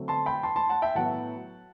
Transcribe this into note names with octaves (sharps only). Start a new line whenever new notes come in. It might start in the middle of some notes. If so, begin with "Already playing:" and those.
Already playing: D3 F#3 A3 C4
A5 C6
G5 B5
A5 C6
A5 C6
F#5 A5
E5 G5
A2 F#3 B3 F#5 A5